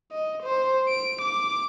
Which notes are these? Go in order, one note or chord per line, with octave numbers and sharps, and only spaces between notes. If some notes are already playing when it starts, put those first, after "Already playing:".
D#5
C5
D7
D6